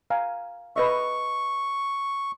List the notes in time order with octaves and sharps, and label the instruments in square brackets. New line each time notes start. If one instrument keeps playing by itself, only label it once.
[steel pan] F5 G#5 A#5
[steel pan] B4 D#5 E5 [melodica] C#6